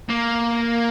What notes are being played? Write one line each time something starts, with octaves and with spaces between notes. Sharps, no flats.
A#3